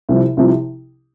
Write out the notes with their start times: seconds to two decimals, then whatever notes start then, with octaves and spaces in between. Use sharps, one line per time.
0.09 C2 C3 F3
0.37 C2 C3 F3